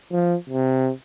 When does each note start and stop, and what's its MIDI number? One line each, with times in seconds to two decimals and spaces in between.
0.12 0.35 53
0.49 0.90 48